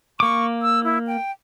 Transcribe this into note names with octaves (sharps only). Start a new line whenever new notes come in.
A#3 C#6 D6
E6
E4
G5